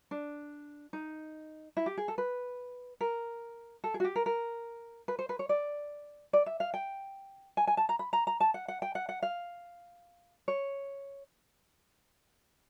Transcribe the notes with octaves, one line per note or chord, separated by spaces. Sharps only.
D4
D#4
E4
G4
G#4
A4
B4
A#4
A4
G#4
F#4
G4
A#4
A#4
B4
C5
B4
C#5
D5
D5
E5
F5
G5
G#5
G#5
A5
A#5
B5
A#5
A#5
A5
F#5
F#5
G5
F#5
F#5
F5
C#5